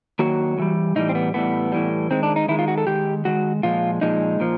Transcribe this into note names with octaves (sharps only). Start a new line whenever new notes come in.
D#3 F#3 A#3 F#4
A2 E3 G3
A2 E3 G3 D#4
C4
B3
A2 E3 G3 B3
A2 E3 G3
D#3 G#3 C4
D4
D#4
D#3 G#3 E4
F4
F#4
A4
D#3 G#3 G4
D#3 G#3 F#4
A#2 F3 G#3 F4
A#2 F3 G#3 D#4
A#2 F3